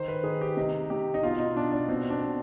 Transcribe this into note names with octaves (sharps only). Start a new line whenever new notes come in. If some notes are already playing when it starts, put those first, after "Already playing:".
Already playing: D#3 C5
B4
D#3 G#4
G4
C3 D#4
C3 G4
D#4
B2 F4
D#4
B2 D4
D4
B2 C4
D4
B2